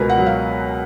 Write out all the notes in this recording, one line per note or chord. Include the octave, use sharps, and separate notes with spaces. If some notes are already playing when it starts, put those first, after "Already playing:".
Already playing: C#2 B2 B3 A#4 B4 G#5 A#5
F#5
F#3
F5